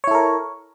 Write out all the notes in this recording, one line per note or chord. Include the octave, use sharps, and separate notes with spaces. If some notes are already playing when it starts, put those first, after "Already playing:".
E4 A4 A#4 C#5